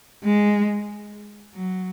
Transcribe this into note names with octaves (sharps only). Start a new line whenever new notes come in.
G#3
F#3